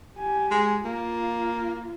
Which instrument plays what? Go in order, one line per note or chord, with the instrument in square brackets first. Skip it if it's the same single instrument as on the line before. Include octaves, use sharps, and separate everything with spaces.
[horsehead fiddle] G4 G#5
[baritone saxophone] G#3
[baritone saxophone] A#3 [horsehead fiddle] F4